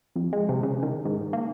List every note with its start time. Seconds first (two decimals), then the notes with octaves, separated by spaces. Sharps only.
0.16 F2
0.33 G#3
0.49 C3
0.63 C#3
0.82 D#3
1.05 G#2
1.33 A#3